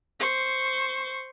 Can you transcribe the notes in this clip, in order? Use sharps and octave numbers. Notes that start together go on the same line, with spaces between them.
C5 C#6